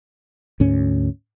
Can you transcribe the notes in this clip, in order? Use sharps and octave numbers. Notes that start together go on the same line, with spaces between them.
D2 G#2 C#4